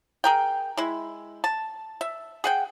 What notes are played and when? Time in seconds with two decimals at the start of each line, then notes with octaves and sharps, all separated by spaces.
0.24 G#4 A#4 G5
0.77 G#3 E4
1.44 A5
2.01 E5
2.44 G#4 F#5 G5